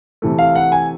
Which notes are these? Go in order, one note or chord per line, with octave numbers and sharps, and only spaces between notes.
C3 E3 A3
F5
F#5
G#5